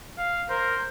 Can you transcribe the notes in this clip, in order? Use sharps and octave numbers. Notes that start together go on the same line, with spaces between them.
F5
A#4 C5